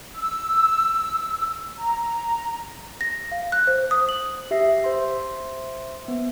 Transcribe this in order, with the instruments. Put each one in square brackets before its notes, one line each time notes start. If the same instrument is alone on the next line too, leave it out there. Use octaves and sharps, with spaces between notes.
[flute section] E6
A#5
[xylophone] A#6
F5
F#6
C5
D#6
F#7
[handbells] G4 E5 A#6 C7
C5 E5 C6
B3